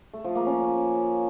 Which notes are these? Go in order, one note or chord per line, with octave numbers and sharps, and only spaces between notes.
A3
F3
A#3
C#4